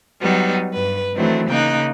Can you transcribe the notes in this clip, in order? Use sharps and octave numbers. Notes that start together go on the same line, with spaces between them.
F#3 G3 B3 D#4
G2 B4
D#3 E3 F#3 A3 C4 D4
C#3 A#3 D#4 G5 F#6